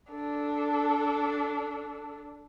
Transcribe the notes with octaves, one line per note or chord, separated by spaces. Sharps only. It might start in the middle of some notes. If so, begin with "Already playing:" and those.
D4 A4